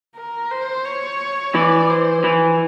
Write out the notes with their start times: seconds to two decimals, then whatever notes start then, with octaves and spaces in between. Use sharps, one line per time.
0.16 A#4
0.51 C5
0.86 C#5
1.55 E3 D5
1.90 C5
2.24 E3